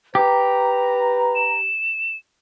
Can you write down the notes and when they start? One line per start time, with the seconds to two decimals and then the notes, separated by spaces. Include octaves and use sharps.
0.15 G4 B4 A#5
1.35 E7